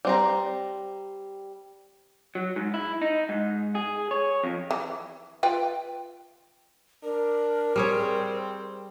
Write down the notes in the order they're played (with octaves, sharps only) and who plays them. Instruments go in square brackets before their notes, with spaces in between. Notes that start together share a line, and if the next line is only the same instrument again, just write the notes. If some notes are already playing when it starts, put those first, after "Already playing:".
[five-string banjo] G3 C4 A#5
[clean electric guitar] F#3
G#2
E4
D#4
G#2
G#4
C#5
F2
[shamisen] E3
F4 B4 G5
[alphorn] D4 [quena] A#4
[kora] G3 G#4 C#5 [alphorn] C4